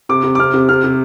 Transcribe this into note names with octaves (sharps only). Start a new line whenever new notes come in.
C3 D6
C3
D6
C3 F6
C3
C3 F6
C3